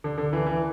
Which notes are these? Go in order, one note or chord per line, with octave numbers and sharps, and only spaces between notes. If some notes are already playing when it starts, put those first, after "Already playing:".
D3
D3
E3
E3